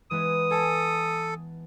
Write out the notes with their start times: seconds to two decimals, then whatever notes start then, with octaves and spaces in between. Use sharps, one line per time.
0.11 E3 G#3 B3 D#6
0.51 A4 G#5 A5